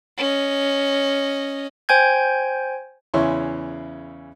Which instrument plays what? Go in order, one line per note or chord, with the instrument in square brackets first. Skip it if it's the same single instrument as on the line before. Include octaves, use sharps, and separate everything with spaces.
[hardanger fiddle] C#4 D#5
[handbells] C5 G5 G#5 G6 G#6
[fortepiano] E2 C#3 E4 C#5 C6 C#6